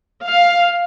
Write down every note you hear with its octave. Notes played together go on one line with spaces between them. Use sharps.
F5